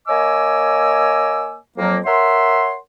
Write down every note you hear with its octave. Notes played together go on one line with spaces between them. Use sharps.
A#3 C#5 D#5 G#5 D6 E6
F2 F#3 A#3
A#4 C#5 E5 F#5 C6